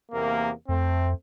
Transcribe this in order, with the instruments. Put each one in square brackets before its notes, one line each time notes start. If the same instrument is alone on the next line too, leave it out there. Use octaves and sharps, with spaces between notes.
[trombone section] E2 C3 A#3
[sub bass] F2 [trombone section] A3 C4